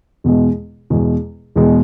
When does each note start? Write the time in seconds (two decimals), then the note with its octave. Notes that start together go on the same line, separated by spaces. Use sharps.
0.24 E2 B2 G#3
0.90 E2 B2 G#3
1.56 E2 B2 G#3